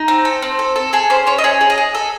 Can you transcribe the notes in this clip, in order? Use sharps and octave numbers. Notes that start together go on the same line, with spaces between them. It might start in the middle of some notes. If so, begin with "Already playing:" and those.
Already playing: D#4
C4
A4
C4
A4
A4
G#4 A4
C#4 C5
C#4 C#5
D#5
G#4 C#5
G#4
D#5
G#4
A4